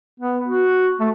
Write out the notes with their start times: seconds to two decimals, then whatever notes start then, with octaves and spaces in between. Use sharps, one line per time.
0.20 B3
0.48 F#4
1.00 A3